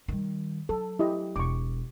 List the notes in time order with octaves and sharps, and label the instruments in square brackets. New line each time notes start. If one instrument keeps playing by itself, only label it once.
[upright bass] D#3 G3
[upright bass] F#3 [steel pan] A4
[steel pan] E4 G4 D#5
[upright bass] E1 [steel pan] C#6 D6